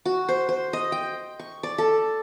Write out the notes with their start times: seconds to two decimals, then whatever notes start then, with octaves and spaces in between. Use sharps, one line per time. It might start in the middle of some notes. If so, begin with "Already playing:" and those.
0.05 F#4
0.29 C5
0.49 C5
0.73 D#5
0.92 G5
1.39 C#6
1.63 D5
1.78 A4